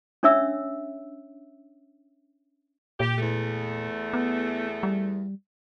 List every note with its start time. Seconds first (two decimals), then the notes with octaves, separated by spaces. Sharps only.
0.23 C#4 D4 C#5 E5 E6
3.00 A#2 G4
3.18 E2 A3
4.13 B3
4.83 G3